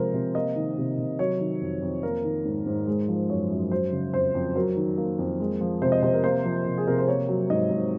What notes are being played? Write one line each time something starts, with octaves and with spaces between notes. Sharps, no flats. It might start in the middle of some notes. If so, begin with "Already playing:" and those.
Already playing: C3 F3 G#3 A#4 C5
C3
A#3 D#5
D#3
C3
C3
F#3 C#5
D#3
F2
F2
A#3 A#4
D#3
G#2
G#2
G#3
F3
F#2 C#5
F#2
F#3 C5
C#3
F2 C5
F2
F#3 A#4
D#3
A#3
F2
G#3
F3
C3 C5
D#5
C3 C5
A#4
A#3 C5
F3
C3
G#4
C3 A#4
C5
A#3 C#5
F#3
G#2 D#5
G#2